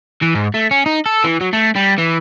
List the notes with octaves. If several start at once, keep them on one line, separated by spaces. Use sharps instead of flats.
E3
G#2
A3
C#4
D#4
A4
E3
F#3
A3
G3
E3